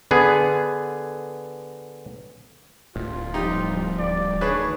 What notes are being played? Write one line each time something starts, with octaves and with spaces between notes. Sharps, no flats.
D3 B3 G#4
D1 F4
F3 G3 D#4 G4
D5
D2 D#3 D4 G#4 B4 C#5